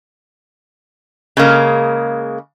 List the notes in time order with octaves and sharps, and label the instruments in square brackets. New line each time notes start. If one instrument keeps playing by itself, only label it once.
[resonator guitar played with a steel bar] C#3 G#3 A#3